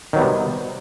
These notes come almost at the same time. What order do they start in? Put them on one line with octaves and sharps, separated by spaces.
D#3 F#3 B3 G3 C3